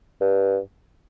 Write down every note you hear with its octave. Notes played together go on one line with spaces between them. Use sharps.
G2